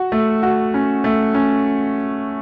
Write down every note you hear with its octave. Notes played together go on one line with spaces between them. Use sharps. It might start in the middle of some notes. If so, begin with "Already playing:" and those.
Already playing: F#4
A3
F#4
C#4
A3
C#4